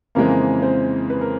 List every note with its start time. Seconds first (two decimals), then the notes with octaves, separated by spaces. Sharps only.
0.15 F2 C#3 E3 G#3 A#3 C4 A#4
0.62 C4 C5
1.10 B4
1.21 A#4